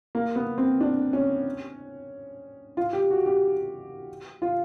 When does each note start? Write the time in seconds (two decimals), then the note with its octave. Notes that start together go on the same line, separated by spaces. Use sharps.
0.15 A#3
0.36 B3
0.58 C4
0.81 D4
1.13 C#4
2.77 F4
2.93 G4
3.11 F#4
3.26 G4
4.42 F4